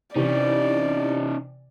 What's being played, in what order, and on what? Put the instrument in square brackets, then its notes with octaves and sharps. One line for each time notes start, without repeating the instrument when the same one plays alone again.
[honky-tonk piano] C3 E3 [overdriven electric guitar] C#4 D#4 [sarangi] D5